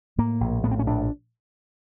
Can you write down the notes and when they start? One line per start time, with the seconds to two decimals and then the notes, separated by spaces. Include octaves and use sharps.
0.18 A2 A#3
0.41 A#1
0.63 A2 B3
0.71 C4
0.79 C#4
0.86 A#1 D4